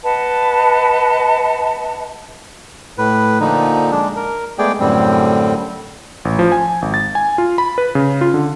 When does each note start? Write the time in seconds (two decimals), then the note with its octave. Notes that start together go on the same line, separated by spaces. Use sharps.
0.03 B4 D#5 F#5 A5
2.98 A2 B4
3.41 A#2 D3 F3 D#4
3.91 G#3 D4
4.16 A#4
4.58 G#3 A3 B3 G#4 D5 G5
4.80 F#2 A2 D3 G3 C4
6.25 A1
6.39 F3
6.52 G#5
6.82 G#1
6.94 A6
7.15 G#5
7.38 F4
7.58 B5
7.78 B4
7.95 C#3
8.21 F4
8.34 D3